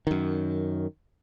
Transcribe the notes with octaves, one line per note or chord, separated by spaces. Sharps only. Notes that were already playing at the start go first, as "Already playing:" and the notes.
F#2 D#3